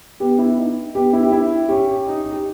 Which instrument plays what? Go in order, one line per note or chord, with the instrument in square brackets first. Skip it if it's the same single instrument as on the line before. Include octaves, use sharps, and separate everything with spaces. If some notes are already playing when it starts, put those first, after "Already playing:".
[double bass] B3 [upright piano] G4
[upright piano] E4
D#4
[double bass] B3 [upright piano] G4
[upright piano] E4
G4
E4
[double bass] C#4 [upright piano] G4
[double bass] D#4
[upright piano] G4